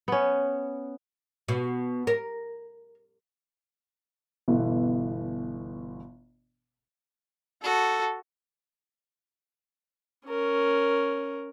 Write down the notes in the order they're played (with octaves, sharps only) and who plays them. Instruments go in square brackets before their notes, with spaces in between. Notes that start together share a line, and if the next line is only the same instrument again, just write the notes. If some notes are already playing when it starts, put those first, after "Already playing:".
[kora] B3 C#4
[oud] B2
A#4
[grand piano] G1 B2 E3
[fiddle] F#4 [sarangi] A4
[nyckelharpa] C#4 A#4